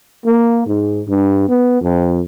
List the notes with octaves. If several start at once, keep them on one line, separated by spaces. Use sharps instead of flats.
A#3
G#2
G2
B3
F2